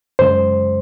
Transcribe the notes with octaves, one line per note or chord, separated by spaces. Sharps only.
F#2 C#3 G#3 C5